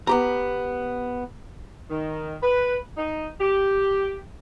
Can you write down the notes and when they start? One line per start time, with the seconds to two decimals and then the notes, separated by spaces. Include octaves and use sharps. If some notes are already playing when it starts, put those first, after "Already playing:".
0.07 B3 G4 A#5
1.89 D#3
2.42 B4
2.97 D#4
3.40 G4